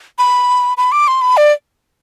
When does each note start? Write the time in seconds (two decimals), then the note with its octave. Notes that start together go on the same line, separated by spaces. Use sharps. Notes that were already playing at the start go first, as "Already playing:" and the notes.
0.18 B5
0.77 B5
0.92 D6
1.08 C6
1.21 B5
1.37 D5